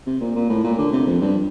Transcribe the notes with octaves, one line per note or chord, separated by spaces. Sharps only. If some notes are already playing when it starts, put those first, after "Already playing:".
C3
A#2
A#2
A2
A#2
D3
C3
F2
G2